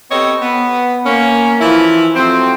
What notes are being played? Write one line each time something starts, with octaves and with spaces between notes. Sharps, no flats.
B3 C4 G4 A4 C#5 D#5
B3
A#3 C#4
E3 F3 E4
F3 F#3 A3 C4